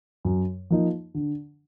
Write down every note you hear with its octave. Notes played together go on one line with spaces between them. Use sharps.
F#2
F3 A#3 D#4
D3